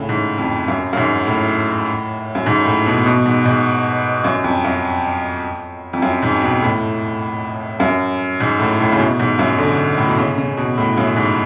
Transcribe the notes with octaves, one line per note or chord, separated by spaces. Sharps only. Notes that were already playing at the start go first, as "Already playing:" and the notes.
Already playing: A2 C#3
G#2
F2
F#2
F#2
G#2
A2
F#2
G#2
A2
B2
B2
G#2
G#2
F#2
F2
F#2
F2
F#2
G#2
B2
A2
F#2
G#2
A2
A2
C#3
B2
G#2
F#2
D3
A2
B2
C#3
C#3
B2
A2
F#2
G#2